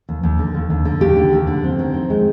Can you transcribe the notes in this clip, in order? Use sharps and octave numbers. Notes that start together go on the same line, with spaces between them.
D#2
D#2
D3
D#2
D#2
D3
D#2 G4
D3
D#2
D3
C4
D#3
C4
G#3